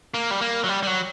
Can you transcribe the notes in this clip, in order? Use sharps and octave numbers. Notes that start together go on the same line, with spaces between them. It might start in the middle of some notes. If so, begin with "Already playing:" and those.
A#3
G3
A#3
F#3
G3
G3
F#3